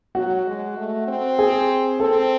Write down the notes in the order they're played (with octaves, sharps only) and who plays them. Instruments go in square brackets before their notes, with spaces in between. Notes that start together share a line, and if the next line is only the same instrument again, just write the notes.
[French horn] F#3 [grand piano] F#4
[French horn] G#3
A3
C4
[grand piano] G#4
[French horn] C4 [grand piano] A4